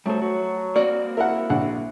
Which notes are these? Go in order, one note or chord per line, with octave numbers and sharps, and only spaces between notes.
F#3 G3 A3 C5
F#3 F#4
A#3 C4 F#4 D5
E4 A#4 F#5
A#1 F#5